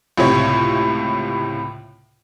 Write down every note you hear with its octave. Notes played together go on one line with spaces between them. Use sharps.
C#2 A2 C3 C#5